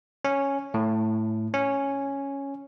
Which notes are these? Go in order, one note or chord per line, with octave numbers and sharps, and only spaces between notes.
C#4
A2
C#4